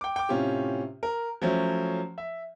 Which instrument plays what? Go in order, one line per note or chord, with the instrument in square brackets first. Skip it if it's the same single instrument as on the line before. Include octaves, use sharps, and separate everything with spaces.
[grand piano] G5 D6
G5 D6
A2 C3 C#4 F4 G4
A#4
F3 F#3 A3 C#4
E5